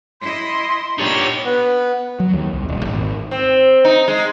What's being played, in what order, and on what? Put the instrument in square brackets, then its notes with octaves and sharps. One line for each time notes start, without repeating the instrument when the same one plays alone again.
[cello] E4 D#5 [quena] C6
[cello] A#2 B3 [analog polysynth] D4 G4 A6 [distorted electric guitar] D#4 C#5
[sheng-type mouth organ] B3
[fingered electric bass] F#3
D#2
C2
D#1
G#1
[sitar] C4
D#4
G#3